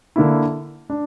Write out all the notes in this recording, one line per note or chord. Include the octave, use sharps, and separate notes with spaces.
D3 A#3 E4
D4